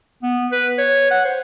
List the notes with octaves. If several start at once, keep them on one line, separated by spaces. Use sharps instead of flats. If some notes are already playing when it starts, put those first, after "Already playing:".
B3
B4
C#5
F#5
C5